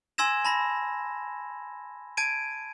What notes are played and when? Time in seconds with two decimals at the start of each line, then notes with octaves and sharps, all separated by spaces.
0.18 G#5 C6 E6 G#6 A#6 E7
0.45 A5 B5 A#6
2.17 A5 G#6 D7 D#7